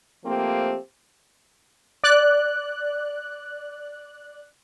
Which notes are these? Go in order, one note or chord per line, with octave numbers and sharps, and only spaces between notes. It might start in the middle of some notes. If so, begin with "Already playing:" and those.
F3 A3 A#3 C4 G4
D5 F#6